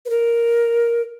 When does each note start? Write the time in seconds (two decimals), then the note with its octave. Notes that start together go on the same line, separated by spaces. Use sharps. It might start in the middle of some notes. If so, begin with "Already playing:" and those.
0.06 B4
0.10 A#4